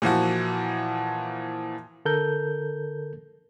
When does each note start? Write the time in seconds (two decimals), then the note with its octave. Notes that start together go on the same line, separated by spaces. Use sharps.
0.02 A#2 E3 F3 F#4
2.05 D3 A4 A#4 G6